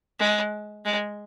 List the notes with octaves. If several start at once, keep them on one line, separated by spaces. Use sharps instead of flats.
G#3
G#3